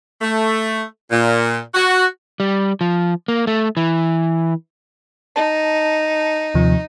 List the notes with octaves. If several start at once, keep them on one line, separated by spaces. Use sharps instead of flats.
A3
A#2
F#4
G3
F3
A#3
A3
E3
D#4 A5
D#2 C3 F3